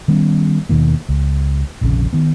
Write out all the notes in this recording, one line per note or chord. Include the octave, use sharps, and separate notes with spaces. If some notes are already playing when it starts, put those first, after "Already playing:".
D#3 G3 B3 C#4
D#2 B2 D#3 A#3
C#2
F1 A#1 F2 C#3
D#3 B3